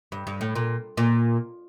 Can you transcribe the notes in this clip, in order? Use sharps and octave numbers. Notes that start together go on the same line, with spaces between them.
G2
G2
A2
A#2
A#2